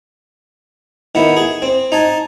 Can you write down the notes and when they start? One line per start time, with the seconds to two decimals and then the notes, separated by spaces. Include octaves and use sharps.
1.15 D#3 B3 E4
1.37 G#4
1.62 C4
1.92 D#4 G#5 A5